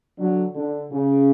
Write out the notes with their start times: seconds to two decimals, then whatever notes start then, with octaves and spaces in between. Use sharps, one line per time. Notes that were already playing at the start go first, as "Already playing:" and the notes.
0.18 D3 F#3
0.55 D3
0.91 C#3